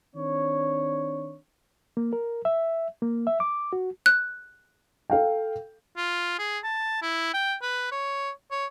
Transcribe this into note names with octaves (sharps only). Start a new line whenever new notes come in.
D#3 C4 D4 C#5
A#3
A#4
E5
A#3
E5
D6
F#4
F#6
A4 F5 G5
F4
G#4
A5
E4
G5
B4
C#5
C#5